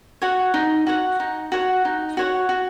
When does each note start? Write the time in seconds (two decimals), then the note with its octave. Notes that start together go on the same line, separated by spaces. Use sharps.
0.22 F#4 C#5 F#5
0.54 D#4
0.87 F#4 C#5 F#5
1.20 D#4
1.52 F#4 C#5 F#5
1.85 D#4
2.17 F#4 C#5 F#5
2.49 F#4